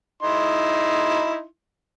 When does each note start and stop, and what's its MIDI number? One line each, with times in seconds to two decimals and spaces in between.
0.23 1.44 63
0.23 1.44 64
0.23 1.44 84